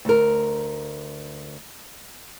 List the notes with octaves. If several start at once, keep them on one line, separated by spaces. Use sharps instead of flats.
D2 A#4